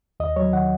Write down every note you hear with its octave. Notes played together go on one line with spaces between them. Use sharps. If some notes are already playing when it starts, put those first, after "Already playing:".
D#2 D#5
F#3 C#5
D#3 F#5